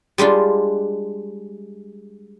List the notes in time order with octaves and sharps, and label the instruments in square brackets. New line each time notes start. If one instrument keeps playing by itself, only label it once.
[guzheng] G3 G#3 D4 F4